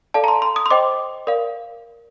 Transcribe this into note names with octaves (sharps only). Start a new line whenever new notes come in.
A4 D5 F5 A5
A#5
C6
C6
D#6
C6
C5 D#5 G5 D6
A#4 D5 F5